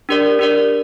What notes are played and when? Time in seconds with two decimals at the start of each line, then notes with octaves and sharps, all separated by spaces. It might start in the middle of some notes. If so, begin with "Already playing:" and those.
0.09 D4 G4 A#4 D5
0.39 D4 G4 A#4 D5